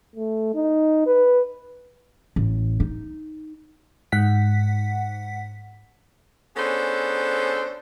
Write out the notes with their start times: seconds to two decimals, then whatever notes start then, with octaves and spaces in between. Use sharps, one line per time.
0.15 A3
0.54 D#4
1.07 B4
2.36 A1
2.80 D#4
4.12 G#2 F#5 B6
6.56 B3 C#4 D4 G#4 A4 C5